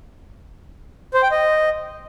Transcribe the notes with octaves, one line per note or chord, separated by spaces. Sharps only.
C5
G5
D#5